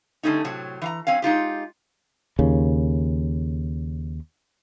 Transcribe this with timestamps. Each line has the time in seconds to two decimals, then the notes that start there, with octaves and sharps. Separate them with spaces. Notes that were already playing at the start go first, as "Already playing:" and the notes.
0.23 D3 G3 A3 C#4 D#4
0.44 A2 C3 F#3
0.82 E3 F5 A#5
1.07 F#3 C4 C#4 F5
1.22 G#3 D#4 F4 G4
2.39 D#2 C#3